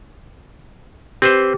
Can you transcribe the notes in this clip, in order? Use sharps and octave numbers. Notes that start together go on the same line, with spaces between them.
C4 G4 B4 C5